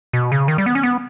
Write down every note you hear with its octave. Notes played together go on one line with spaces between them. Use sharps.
B2
C#3
D#3
G3
B3
C#4
B3